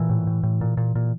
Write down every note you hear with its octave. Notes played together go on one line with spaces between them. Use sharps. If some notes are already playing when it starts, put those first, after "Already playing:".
Already playing: A#2 E3
A2
A2
A2
A#2
A#2
A#2